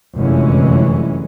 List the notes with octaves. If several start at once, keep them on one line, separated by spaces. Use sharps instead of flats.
F1 F#2 D3 E3 G#3 C#4